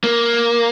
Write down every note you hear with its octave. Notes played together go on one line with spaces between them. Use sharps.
A#3